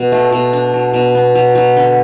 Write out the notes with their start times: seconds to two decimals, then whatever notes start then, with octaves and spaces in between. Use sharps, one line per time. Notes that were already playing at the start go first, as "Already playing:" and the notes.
Already playing: B2
0.12 A3
0.32 B2
0.53 D4
0.74 F#3
0.93 B2
1.15 B3
1.35 F#3
1.55 F#3
1.76 D3